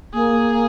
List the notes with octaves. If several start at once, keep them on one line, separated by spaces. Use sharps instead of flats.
A#3 G#4